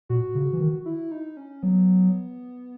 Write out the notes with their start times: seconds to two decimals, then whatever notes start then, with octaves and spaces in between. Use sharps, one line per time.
0.09 A#2 F#4
0.35 C#3
0.53 E3
0.60 D#3
0.85 E4
1.11 D#4
1.37 C#4
1.62 F#3 B3